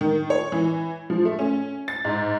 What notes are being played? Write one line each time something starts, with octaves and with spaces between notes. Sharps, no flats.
D#3
C#5
E3
F3
A3
C#4
A6
G#2